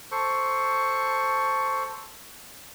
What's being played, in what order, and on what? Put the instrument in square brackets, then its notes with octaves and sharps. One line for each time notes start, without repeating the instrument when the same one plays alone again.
[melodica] A4 C5 C#6